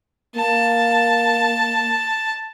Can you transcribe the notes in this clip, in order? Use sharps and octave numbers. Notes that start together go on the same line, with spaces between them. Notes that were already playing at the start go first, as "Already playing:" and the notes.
A#3 A5